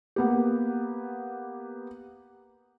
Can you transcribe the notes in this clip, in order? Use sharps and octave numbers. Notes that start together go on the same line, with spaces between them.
A#3 B3 G4